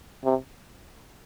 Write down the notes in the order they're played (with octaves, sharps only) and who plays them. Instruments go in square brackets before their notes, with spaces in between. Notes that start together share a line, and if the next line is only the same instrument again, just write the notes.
[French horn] C3